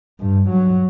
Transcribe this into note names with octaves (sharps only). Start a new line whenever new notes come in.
G2
F#3